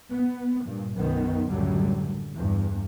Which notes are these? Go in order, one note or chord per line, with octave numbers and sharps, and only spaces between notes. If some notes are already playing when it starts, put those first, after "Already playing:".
B3
G2 A#2
B1 F#2 D#3 B3
C#2 F#2 A2 D3 F#3 G3
E2 G2